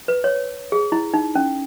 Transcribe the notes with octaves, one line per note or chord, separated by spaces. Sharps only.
B4
C#5
G#4
E4
D#4
C#4